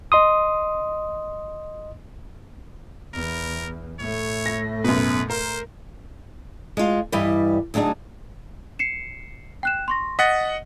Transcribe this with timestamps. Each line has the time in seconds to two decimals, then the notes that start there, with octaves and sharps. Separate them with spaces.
0.12 D#5 C6 D#6
3.14 E2 A#4
3.99 A2 A3 C#5
4.46 A#6
4.84 F#2 B2 B4
5.30 A#4 C5
6.77 G#3 F4
7.12 G2 E3 G3 G4 B4 D#5
7.74 D2 F#3 D4 D#4 G#4
8.79 C7 C#7 E7
9.63 G5 F#6 E7
9.88 C6 C#6 A#6
10.19 D#5 F#5 A6 B6